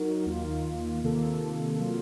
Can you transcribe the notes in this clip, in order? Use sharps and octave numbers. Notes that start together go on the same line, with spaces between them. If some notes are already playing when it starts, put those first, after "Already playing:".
Already playing: F#3 D#4 F#4 A#4
D#2 D#3 A#3 F4
C3 D#3 A#3 F4 A4
F#3 A#3 F4